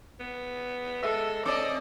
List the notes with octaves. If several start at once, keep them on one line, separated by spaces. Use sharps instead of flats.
B3
G#3 A4 E5
C4 A4 D5 D#5 D6